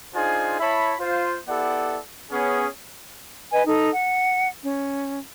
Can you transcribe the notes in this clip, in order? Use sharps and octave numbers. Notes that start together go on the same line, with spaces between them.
D4 D#4 F4 G#4 C5 G#5
E4 C#5 E5 A5 B5
F4 C5
B3 E4 G4 A4 D5 F#5
B3 C#4 G#4
B4 D#5 G#5
D#4 A4
F#5
C#4